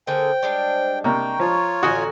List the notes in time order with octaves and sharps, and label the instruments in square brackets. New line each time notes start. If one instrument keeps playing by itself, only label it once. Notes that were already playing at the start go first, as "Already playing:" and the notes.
[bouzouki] D3 A#3 G#4 [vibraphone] C5 [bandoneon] G5
[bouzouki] G3 G#3 D4
[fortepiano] C3 A#3 [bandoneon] G5 [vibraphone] A#5 C#6
[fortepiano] F3 [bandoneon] F4 C#5
[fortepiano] A1 F#4 D#6 [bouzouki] D3 C#4 G#5